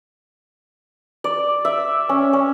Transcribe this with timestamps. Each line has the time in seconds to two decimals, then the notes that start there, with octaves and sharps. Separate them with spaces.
1.24 D5
1.65 E5
2.09 C#4
2.33 C#4